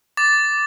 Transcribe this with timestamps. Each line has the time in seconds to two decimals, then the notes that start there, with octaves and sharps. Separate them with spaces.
0.17 D6 A6